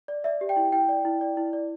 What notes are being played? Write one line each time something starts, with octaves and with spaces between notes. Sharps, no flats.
D5
D5 E5
G4
G5
E4
E4 G5
D5
E4
D5
E4
D5